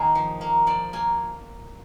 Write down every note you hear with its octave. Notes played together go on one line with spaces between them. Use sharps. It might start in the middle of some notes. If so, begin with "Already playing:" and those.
Already playing: D#3 A#3 D#4 G#4
F3
A#3
F3 D5
A#3 G#5